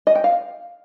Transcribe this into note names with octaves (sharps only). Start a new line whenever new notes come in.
D#5
G5
F5